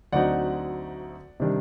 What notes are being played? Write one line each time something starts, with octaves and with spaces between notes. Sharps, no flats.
D2 D3 F#3 C4 D#4 D5 F#5
C3 D#3 G3 D4